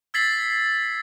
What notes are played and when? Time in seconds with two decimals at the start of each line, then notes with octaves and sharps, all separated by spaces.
0.14 E6 G#6 A6 B6 C7 F#7